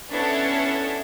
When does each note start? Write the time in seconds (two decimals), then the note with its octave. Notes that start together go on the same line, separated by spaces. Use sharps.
0.12 B3 C#4 D4 E4 A4 C#5